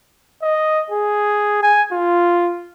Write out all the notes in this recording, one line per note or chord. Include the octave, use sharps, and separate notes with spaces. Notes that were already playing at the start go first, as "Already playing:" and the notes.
D#5
G#4
G#5
F4